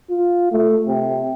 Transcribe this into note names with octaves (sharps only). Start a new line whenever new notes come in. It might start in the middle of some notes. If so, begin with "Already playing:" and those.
F4
A3
C3